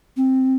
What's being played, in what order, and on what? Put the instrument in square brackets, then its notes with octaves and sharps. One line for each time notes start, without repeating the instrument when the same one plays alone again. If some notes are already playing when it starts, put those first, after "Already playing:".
[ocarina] C4